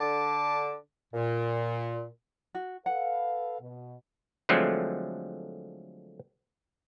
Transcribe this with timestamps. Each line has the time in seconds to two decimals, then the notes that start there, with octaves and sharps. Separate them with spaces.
0.01 D3 A5 D6
1.14 A#2
2.55 F#4
2.86 A4 B4 F5 F#5
3.61 B2
4.49 D3 F3 F#3 G#3 A3 C4